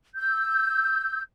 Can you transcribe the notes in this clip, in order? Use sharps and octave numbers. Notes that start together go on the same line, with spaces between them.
E6 G6